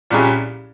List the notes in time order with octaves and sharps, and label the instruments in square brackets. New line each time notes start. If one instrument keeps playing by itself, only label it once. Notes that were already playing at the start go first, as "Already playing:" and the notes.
[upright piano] C2 A#2 G3 C#4 G#4